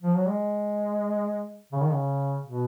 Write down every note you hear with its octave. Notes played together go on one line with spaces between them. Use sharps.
F3
F#3
G#3
C#3
D#3
C#3
B2